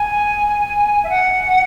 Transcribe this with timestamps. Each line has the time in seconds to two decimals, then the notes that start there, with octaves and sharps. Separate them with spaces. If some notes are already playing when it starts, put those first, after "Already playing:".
Already playing: G#5
1.04 E5
1.10 F#5